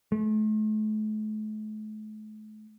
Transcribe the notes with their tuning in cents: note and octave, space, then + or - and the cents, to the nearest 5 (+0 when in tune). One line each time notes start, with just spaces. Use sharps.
A3 -40